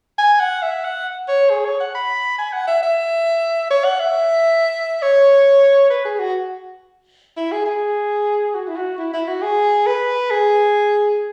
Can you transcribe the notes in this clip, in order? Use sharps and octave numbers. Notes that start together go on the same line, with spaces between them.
G#5
F#5
E5
F#5
C#5
G#4
C#5
F#5
B5
G#5
F#5
E5
E5
C#5
F#5
E5
C#5
B4
G#4
F#4
E4
G#4
G#4
F#4
E4
F#4
E4
E4
F#4
G#4
B4
G#4